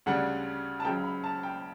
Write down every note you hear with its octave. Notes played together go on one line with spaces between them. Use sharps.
D2 C#3 G3 D4 F#5
A5
C#2 C#3 F#3 G5
B5
A5
G5